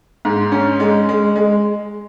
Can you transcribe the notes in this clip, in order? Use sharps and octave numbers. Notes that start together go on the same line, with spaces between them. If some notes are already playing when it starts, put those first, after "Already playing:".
G#2
C#4
G#3
G#3
G#3